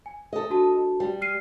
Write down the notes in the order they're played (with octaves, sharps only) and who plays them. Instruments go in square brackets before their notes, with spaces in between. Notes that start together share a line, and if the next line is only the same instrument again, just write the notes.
[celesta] G#5
[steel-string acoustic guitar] A4 D#5
[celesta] D4 F#4 A5
[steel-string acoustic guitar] G3
[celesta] F6 C7 D#7